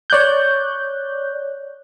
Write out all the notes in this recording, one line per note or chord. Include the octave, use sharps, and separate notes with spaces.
C#5 D5 F#6 G6